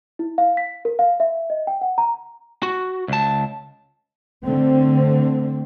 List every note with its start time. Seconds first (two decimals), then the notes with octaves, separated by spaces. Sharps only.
0.19 E4
0.38 F5
0.57 B6
0.85 A#4
0.99 F5
1.20 E5
1.50 D#5
1.67 G5
1.81 F#5
1.98 A#5
2.63 F#4
3.08 C#2 A5
4.45 D3 A3 C4